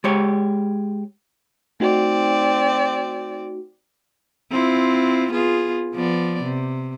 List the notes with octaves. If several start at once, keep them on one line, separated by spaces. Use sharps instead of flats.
G#3 G4 C#5
A3 C4 D#4 F#4 D5
C4 E4 F4
B3 F4 G#4
F3 B3 D5
C3